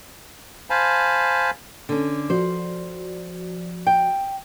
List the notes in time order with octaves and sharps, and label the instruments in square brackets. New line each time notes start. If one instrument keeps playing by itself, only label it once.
[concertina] C5 F5 G#5 A5 B5
[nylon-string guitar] D3 C#4
[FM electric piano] F3 F#4 D5 [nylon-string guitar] C5
[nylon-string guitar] G5